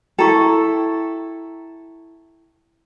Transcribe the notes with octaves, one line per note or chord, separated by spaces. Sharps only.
E4 A4 G5 A#5 C#6